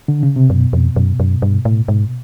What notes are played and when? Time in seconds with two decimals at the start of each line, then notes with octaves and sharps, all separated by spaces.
0.08 D3
0.23 C#3
0.36 C3
0.50 F#2 B2
0.73 F2
0.96 F#2
1.20 F#2
1.42 G2
1.65 A2
1.88 G#2